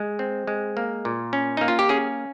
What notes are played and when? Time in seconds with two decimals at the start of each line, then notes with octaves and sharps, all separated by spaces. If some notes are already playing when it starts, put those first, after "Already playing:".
Already playing: G#3
0.19 C4
0.47 G#3
0.77 A#3
1.05 A#2
1.33 C#4
1.57 A#3 D#4
1.68 F4
1.79 G4
1.89 C#4 G#4